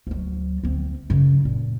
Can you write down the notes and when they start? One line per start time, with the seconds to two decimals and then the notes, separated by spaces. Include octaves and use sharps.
0.07 D2 F#3
0.63 D2 C4
1.10 F#2 C#3
1.45 A#2